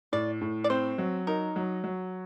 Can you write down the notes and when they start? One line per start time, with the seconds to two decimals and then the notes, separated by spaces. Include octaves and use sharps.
0.12 A2 D5
0.41 A2
0.64 D5
0.70 C4 C5
0.98 F#3
1.27 D#4 A#4
1.56 F#3
1.84 F#3